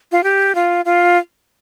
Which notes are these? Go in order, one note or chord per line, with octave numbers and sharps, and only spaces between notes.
F4
G4
F4
F4